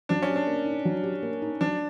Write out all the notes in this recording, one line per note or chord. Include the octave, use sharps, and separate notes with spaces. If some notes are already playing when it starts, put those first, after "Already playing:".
F#3 D4
C#4
G4
D4
A#3
D#4
F#3
G4
A#3
D#4
F#3 D4